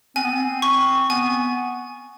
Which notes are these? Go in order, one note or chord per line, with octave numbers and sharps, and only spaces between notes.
C4 G#5
B3
C4
C#6
B3 G#5